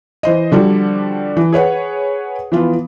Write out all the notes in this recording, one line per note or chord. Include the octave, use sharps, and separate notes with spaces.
E3 C5 D#5
D3 F3 G3 F#4
E3
G#4 B4 C#5 F#5
E3 F3 B3 F4